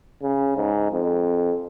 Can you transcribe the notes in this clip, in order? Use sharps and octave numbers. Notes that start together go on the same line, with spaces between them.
C#3
G#2
F2